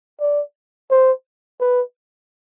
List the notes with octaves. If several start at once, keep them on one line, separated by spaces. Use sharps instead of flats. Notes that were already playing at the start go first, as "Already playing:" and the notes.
D5
C5
B4